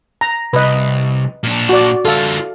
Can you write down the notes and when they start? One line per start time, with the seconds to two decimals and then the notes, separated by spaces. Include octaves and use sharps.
0.21 A#5
0.53 C2 B4 D#5
1.43 A#2 D4
1.69 F#4 D5
2.05 D3 F4 A4 F5